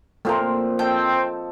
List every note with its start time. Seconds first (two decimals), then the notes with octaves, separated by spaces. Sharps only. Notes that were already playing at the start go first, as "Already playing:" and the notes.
0.25 A#2 F3 A3 C4 F4 A#4
0.79 C4 A4 D#5 G5 A5